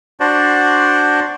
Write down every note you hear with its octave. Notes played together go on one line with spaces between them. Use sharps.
D4 F#4 C5 D5